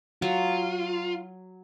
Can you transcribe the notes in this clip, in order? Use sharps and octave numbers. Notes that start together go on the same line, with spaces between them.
F#3 F4